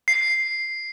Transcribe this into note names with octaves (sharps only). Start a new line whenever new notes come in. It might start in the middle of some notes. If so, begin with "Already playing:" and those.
C7